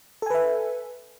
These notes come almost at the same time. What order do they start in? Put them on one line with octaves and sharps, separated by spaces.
A4 G#5 B4 E5